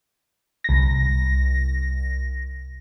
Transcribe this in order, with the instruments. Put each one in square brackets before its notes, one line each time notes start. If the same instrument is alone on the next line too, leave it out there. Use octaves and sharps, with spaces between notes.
[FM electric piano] C2 A#6